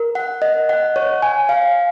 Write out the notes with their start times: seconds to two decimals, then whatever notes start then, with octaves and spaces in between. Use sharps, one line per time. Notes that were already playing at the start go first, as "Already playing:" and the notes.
Already playing: A#4
0.15 F#5
0.42 D#5
0.69 F#5
0.96 C#5
1.22 G#5
1.49 F5